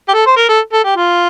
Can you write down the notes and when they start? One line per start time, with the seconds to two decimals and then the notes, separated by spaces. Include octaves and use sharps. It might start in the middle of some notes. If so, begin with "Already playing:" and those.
0.09 G4
0.14 A4
0.26 C5
0.37 A#4
0.49 A4
0.73 A4
0.84 G4
0.96 F4